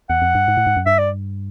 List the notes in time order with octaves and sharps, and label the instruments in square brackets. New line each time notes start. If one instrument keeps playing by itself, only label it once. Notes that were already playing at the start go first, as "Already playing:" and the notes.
[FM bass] E2 [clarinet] F#5
[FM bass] F2
G2
G#2
A2
G#2
F#2
[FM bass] G2 [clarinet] E5
[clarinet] D5